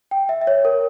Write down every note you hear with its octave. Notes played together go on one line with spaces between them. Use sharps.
G5
E5
E5
C#5
A#4